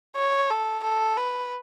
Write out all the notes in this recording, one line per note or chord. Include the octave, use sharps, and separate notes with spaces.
C#5
A4
A4
B4